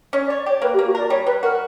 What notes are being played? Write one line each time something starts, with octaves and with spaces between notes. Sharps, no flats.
C#4 C#5
D5
C#5
D5
G4 C#5
A#3 B4
G4
A#3
F#4
A#4 D5
G3 C#5
G3 B4
F#4 A#4